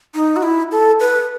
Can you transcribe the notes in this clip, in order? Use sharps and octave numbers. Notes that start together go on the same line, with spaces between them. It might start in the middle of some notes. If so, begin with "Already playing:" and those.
D#4
F#4
E4
A4
B4